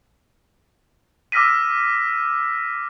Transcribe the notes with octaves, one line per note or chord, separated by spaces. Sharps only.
D6 E6 F6 A#6 B6 D#7